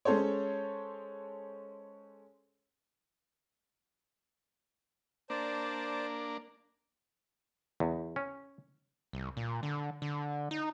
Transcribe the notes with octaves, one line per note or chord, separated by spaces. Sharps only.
G#3 C#4 A4 C5 C#5
A#3 D4 C5 D5 A5
E2
C#4
C2
A#2
D3
D3
D#4